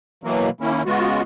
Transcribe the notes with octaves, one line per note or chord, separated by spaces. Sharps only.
B2 E3 F#3 A#3
D#3 A#3 C#4 E4
C#3 G#3 B3 F4 F#4